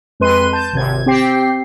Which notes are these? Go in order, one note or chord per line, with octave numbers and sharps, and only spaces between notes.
F2 G#3 B4 C6 D#7
A5 G6
G#1 C3 G#6
C4 G4 G5 C7